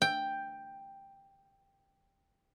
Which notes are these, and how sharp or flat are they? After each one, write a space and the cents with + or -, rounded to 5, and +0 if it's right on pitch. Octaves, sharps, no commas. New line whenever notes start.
G5 +5